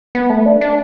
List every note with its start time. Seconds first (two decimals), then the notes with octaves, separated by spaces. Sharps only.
0.15 B3
0.30 A3
0.46 D4
0.61 D4